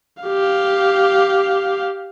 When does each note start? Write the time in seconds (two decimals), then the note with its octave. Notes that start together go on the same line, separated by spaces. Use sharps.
0.23 G4 F5